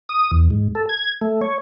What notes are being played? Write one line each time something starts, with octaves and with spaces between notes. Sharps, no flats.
D#6
E2
G#2
A4
G#6
A3
C#5